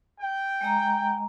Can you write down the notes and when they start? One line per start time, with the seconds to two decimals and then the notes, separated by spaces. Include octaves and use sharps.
0.20 G5
0.61 G#3 D#5 A#5